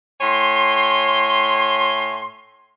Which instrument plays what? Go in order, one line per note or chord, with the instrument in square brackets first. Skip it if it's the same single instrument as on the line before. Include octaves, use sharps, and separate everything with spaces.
[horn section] A2 C#5 G#5 C6